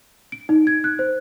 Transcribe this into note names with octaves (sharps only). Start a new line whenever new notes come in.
D7
D#4
G#6
F#6
C5